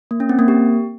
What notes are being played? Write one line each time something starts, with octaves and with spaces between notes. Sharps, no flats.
A#3
C#4
C4
A#3
G4